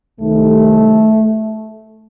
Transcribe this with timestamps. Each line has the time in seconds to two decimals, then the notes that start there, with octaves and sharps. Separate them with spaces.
0.20 C2 C3 D#3 A3